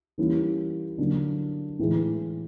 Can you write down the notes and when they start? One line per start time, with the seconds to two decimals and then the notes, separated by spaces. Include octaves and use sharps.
0.18 E3 G3 A#3 C#4 E4
0.98 D3 F#3 A#3 D4
1.79 A2 E3 G#3